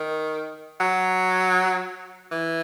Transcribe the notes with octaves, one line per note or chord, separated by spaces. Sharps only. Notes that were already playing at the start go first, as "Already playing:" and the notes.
Already playing: D#3
F#3
E3